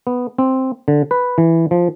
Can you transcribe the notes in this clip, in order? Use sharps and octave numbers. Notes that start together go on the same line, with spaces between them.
B3
C4
D3
B4
E3
F3